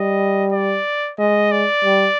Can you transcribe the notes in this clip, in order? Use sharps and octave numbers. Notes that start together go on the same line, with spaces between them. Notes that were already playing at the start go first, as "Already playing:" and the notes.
Already playing: G3 D#5
D5
G#3 D#5
D5
G3